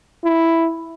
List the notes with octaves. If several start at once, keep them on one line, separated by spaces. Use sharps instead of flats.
E4